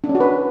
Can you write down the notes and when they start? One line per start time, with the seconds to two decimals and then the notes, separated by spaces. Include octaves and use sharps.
0.04 D4
0.09 C#4
0.15 F#4
0.20 B4